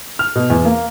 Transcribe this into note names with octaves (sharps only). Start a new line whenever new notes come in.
F6
B2
E2
A#3